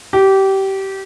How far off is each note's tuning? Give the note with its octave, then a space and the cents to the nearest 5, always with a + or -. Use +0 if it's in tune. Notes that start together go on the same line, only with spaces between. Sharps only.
G4 -20